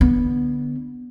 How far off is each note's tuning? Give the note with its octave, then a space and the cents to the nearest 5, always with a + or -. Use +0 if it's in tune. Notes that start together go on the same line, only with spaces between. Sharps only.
D3 +0 B3 -10